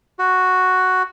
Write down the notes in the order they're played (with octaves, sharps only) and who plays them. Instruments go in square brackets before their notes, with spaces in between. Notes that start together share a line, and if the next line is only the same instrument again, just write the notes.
[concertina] F#4